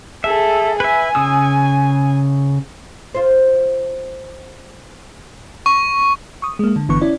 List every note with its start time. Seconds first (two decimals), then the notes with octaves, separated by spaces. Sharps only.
0.24 G#4 A4 E5
0.80 B4 E5 G#5
1.15 C#3 D#6 E6
3.14 F4 C5
5.66 C#6
6.42 C#6 D#6
6.59 G#3 A#3
6.76 D3
6.89 G1 D3 E3 B3 C#6
7.01 C#4 E4 D5